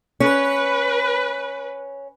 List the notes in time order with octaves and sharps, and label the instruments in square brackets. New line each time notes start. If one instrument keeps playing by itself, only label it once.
[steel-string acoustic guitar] C#4 [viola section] B4